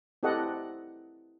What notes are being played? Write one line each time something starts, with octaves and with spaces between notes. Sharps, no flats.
C4 E4 G4 A4 D#5 F#5